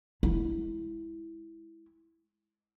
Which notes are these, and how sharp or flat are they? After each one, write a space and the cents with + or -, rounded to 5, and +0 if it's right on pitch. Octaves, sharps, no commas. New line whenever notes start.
G#3 +0 E4 +0